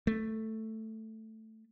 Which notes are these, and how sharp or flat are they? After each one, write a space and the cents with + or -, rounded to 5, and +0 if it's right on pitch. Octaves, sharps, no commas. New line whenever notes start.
A3 +5